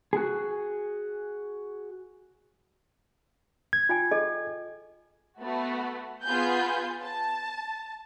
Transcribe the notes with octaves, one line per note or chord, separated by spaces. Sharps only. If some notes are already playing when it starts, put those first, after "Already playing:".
F#4 G#4
G#6
F4 G5 G#5
G#4 A4 D#5
A3 B3 F#4
B3 F4 G#4 G#5 G6
A5